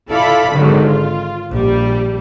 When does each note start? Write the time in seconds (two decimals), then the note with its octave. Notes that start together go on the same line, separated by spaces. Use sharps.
0.12 E4 F4 A4 D5 F5 B5
0.53 G#1 G#2 D3 D#3 F#3
0.87 F4
1.52 A#1 G3 G4